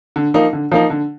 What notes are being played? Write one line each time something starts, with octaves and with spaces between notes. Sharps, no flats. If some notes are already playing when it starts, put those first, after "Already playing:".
D3
F3 A#3 D#4
D3
F3 A#3 D#4
D3